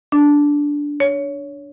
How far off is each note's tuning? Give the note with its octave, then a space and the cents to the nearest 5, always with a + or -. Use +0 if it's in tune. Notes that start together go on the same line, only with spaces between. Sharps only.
D4 -10
C#5 +20